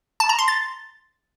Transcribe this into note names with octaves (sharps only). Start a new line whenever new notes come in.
A5
A#5
C6
A6